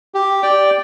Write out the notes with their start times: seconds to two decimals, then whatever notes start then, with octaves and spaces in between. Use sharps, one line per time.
0.15 G4
0.43 D5 G5